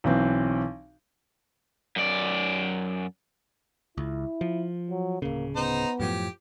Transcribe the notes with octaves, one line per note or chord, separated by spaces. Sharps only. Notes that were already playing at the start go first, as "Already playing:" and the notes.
B1 E3 C4
F#2 D5
C#2 E4
F3
F#3
D1 C#3 A#3
B3 D#4 C5 A#5
F#2 A2 F3 G4